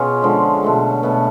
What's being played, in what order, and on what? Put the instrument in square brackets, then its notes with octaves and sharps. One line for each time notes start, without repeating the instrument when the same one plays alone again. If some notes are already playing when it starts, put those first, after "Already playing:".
Already playing: [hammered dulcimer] B2 C#4 F4 G#4 B4
D3 F3 G#3
B2 F#3 A3
B2 A3 B3